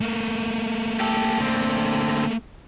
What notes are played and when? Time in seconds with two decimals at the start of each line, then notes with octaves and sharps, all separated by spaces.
0.01 A3 A#3
1.00 G4 A4
1.41 D3 C4